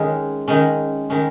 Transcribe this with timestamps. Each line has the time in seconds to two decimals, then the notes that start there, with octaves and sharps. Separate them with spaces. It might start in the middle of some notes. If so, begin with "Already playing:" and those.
Already playing: D#3 G#3 C#4
0.48 D#3 G#3 C#4
1.10 D#3 G#3 C#4